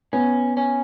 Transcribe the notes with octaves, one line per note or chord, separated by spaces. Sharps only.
B3 C#4
C#4